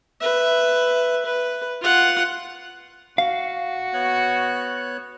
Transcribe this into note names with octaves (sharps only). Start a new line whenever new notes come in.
B4 E5
B4
F4 F#5
F#4 F5
B3 C#5 F#6